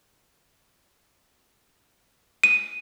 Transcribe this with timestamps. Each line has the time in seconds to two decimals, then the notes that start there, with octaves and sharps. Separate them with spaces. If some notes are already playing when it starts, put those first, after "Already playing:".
2.44 D#7